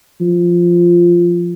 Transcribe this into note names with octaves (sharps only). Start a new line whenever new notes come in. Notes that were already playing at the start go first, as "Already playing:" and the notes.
F3